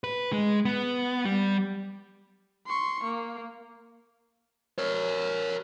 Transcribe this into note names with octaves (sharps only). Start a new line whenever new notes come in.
B4
G#3
B3
G3
C6 C#6
A#3
A#4 C#5